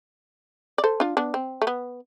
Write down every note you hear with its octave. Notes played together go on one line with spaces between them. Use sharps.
D5
A4 C5
D4 F4
B3 D4
C4
A3
B3